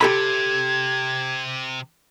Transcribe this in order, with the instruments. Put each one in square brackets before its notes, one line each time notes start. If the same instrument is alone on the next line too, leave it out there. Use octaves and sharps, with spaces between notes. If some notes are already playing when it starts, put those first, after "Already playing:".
[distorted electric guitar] C3 [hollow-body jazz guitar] G4 A4 B5 [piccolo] G#6